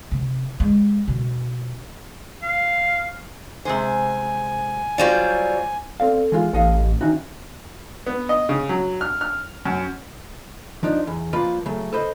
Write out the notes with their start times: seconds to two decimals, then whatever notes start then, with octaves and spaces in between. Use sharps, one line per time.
0.12 C3
0.60 G#3
1.08 B2
2.43 F5
3.65 C3 G#3 C5 G#5
4.98 F#3 G3 F4 C5 D5
6.00 C4 A4 D5 F5
6.32 E3 G#3 F4
6.53 A1 G4 A4 D#5 F5
7.01 D#3 C#4 D#4 F#4 E5
8.06 B3
8.29 D#5
8.49 C#3
8.69 F#3
9.01 F6
9.21 F6
9.66 F#2
10.83 F3 D4 D#4
11.07 E2
11.33 F3 A#3 F4 B4 D5
11.65 C#3 F#3 A3
11.93 A4 B4 C5 D#5